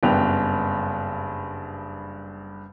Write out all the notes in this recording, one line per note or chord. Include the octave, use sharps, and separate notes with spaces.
F#1 G2 B3 D5 G5 F7